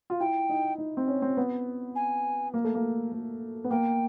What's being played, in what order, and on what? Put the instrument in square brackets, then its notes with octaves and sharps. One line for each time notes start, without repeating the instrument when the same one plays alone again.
[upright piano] F4
[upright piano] E4 [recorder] G5
[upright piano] D#4
D#4
C4
C#4
C4
B3
[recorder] G#5
[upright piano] A#3
A3
A#3
A#3
B3
[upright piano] A#3 [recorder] G5